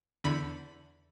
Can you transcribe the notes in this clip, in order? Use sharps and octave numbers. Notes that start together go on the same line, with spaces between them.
E2 D3 B5